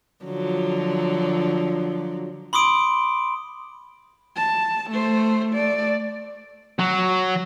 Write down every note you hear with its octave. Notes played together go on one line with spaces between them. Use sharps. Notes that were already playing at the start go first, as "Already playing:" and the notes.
D3 F3 F#3
B5 C6 D6 D#6 D7
A5
A3 C5
A3 D5
F#3